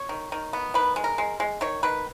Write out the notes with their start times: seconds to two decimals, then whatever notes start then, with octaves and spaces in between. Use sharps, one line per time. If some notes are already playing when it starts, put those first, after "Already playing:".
Already playing: C#5
0.09 D#3
0.32 D#3
0.53 B3
0.74 D#3 B4
0.96 G#3
1.04 A#4
1.18 G#3
1.40 G#3
1.61 D#3 C#5
1.83 D#3 B4